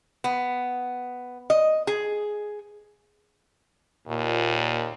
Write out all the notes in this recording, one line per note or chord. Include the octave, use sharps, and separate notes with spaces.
B3
D#5
G#4
D#2 A#2